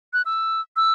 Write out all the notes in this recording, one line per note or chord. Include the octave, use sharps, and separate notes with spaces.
F#6
E6
E6